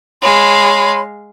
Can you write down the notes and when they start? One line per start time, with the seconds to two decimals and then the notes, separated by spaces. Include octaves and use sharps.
0.22 G#3 C#5 F5 B5 C6